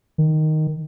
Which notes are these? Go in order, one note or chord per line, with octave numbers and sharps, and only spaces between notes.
D#3